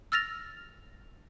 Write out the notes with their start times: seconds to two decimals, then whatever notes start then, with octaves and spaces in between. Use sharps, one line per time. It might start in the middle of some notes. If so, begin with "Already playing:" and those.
0.12 E6 F6 A6 A#6 F7